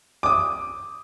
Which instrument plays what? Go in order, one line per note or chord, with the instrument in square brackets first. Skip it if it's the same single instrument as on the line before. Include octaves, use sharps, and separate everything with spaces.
[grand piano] D6 D#6